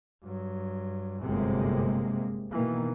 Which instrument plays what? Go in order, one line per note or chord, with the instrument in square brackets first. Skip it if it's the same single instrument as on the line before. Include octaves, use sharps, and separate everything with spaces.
[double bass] G2 F#3
[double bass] G1 F#2 [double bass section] C3 G#3 A#3
[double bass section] B2 D#3 A#3 [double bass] E3